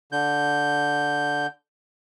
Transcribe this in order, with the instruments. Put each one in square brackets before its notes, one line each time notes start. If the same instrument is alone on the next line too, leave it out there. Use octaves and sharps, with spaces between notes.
[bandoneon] D3 G6